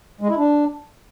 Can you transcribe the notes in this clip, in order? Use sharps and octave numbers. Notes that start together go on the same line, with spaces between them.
G#3
E4
D4